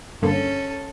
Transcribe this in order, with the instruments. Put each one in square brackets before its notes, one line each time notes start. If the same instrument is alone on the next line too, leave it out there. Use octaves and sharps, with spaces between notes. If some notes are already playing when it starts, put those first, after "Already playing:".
[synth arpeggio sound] G2 D3 A#3 [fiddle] C#4 A4